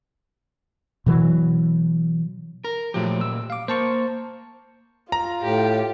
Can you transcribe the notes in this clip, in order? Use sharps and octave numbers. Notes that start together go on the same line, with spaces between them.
B2 E3 F#3
A#4
A#2 F3 F#3 A3 G4
E6
F5 D6
A#3 C5 A5 C#6
F4 A#5
A2 G4